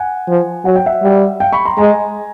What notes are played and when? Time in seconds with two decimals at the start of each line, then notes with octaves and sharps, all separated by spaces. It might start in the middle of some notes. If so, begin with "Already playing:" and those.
Already playing: F#5 G#5
0.28 F3
0.65 F#3 F#5
0.76 G5
0.86 E5 F#5
1.03 G3
1.40 F5 G5
1.52 B5 C#6
1.65 A#5 C6
1.78 G#3 G#5 A#5